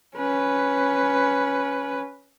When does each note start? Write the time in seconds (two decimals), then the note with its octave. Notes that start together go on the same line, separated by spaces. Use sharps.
0.16 C#4 B4